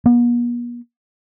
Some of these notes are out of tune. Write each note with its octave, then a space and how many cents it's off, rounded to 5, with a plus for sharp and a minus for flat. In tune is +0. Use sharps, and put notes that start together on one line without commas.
B3 -45